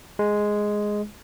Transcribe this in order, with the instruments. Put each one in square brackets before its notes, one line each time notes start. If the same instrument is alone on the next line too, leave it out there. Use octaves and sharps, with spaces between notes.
[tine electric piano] G#3